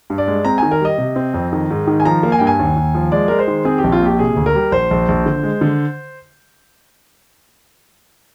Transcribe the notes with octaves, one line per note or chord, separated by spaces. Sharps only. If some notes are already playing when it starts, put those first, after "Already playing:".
G2
D5
G#3
C4 A#5
D#3 G#5
A#4
G3 D#5
C3
C4
F2
D#3
G#2
D#3
G#5
F3 A#5
A#3
G#5
G2 G5
G#5
D#2
D#2
F3
G#3 D5
G#3 A#4
C5
D#3
C4 G#4
G4
A#1
F4
A#2 G4
C3 G#4
D2
A#4
G3
A#1 C5
A#1
A#1
D3
G#3
D3